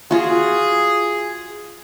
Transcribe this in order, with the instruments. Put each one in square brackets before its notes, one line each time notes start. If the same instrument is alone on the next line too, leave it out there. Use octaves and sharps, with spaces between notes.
[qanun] F4 F#4 [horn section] G#4